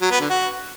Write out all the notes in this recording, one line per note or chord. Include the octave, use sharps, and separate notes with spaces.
F#3
B3
D3
F#4